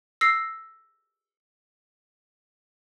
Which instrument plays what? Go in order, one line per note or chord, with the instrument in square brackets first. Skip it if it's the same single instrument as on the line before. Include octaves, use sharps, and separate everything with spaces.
[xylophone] E6 A#6 C7